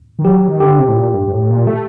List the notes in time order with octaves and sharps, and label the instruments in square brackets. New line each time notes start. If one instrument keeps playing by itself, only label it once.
[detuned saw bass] D#3
[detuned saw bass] F#3 [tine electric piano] G4
[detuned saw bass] D#3
[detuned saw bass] D3 [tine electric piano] G4
[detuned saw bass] C3
A2
A#2
G2
G2
A2
A#2
A3